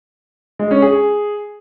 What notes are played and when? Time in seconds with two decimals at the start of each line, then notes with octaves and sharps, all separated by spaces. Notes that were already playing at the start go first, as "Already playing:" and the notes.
0.59 G#3
0.71 C#4
0.82 G#4